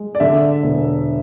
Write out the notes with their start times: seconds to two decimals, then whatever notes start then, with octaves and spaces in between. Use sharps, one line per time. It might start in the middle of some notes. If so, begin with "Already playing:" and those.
Already playing: G#3
0.15 D5
0.20 D3 E5
0.63 E1